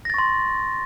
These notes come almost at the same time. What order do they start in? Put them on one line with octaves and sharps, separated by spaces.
A#6 A6 C#6 C6